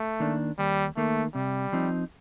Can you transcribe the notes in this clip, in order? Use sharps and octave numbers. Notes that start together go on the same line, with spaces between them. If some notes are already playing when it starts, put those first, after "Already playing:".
Already playing: A3
D#3 A#3 D4
D#2 G3
D#3 A3 A#3
C3 G3
F3 C4 D#4